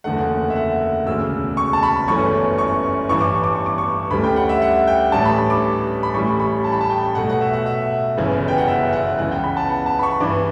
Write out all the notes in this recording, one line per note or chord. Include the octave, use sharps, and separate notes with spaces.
F#1 E2 D3 A3 F#5
E5
F#5
E1 D2 C#3 E6
C#6
A5
B5
G1 F#2 E3 A3 C#4 C#6
C#6
A1 G2 E3 B3 C#6
D6
C#6
D6
C#6
D6
C#6
D2 D3 G3 C#4 B5
G5
F#5
E5
F#5
G5
A1 A2 E3 G3 D4 A5
B5
D6
B5
A1 A2 G3 C#6
B5
A5
B5
A5
G5
B1 B2 A3 F#5
F#5
E5
F#5
E5
G1 F#2 C#3 E3 B3
G5
F#5
E5
F#5
C#2 C#3 E3 B3 F#5
G5
B5
A5
F#5
A5
B5
C#6
G2 E3 B3 D4 D6